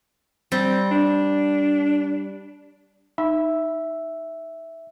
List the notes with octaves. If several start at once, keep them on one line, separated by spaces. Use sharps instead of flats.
G3 C4
D4
D#4 E5